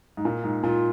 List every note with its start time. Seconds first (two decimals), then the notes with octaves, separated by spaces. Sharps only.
0.17 G#2
0.25 A#2
0.44 G#2
0.63 A#2 F4